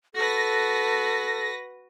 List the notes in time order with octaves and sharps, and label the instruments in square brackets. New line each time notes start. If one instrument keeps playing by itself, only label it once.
[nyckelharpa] F#4 B4 [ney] A4 [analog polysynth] A#6